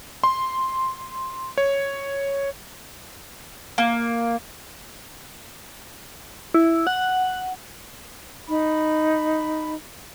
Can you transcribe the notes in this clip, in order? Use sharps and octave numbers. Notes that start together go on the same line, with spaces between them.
C6
C#5
A#3
E4
F#5
D#4 B5